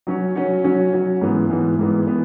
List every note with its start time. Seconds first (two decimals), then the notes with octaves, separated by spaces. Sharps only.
0.07 F#3 C#4 F#4 C#5
0.35 F#3 C#4 F#4 C#5
0.64 F#3 C#4 F#4 C#5
0.93 F#3 C#4 F#4 C#5
1.21 G#2 E3 B3
1.50 G#2 E3 B3
1.79 G#2 E3 B3
2.07 E3 B3